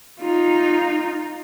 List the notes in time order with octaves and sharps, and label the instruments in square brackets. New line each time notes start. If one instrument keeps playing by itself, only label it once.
[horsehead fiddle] D#4 F4